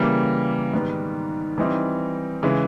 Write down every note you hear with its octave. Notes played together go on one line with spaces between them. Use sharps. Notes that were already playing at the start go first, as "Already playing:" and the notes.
Already playing: C#3 E3 G3 A#3
G#2 D#3 G3 B3
E3 G3 C4 D#4
C#3 E3 G#3